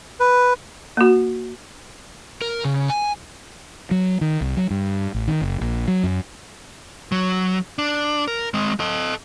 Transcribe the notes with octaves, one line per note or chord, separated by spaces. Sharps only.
B4
A#3 F#4
A#4
C#3
G#5
F#3
D#3
C2
F#3
G2
A1
D#3
F#1
A#1
F#3
F#2
F#3
D4
A#4
G#3 C4
A4 D#5